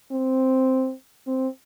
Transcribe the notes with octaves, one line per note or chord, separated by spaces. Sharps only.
C4
C4